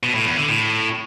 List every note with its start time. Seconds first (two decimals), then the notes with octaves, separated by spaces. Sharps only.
0.03 B2
0.15 A2
0.26 E2
0.37 D3
0.49 A2